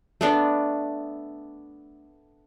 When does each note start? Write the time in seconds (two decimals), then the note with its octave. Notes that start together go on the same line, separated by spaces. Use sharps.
0.21 A3 B3 D4